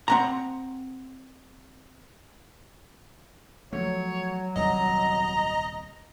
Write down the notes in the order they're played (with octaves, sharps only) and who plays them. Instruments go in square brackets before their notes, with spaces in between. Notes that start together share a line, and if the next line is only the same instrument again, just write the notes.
[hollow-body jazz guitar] C4 F#5 A#5
[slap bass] F3 A3 [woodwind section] F#3 [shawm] C#5
[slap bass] D#1 C2 G3 [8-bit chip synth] D#5 [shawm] A#5